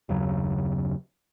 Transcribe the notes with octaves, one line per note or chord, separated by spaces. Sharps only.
F#1 D#2 C#3 F#3